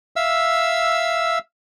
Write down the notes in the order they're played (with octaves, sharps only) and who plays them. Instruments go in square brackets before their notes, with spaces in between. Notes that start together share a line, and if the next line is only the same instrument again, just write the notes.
[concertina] E5 F5 E6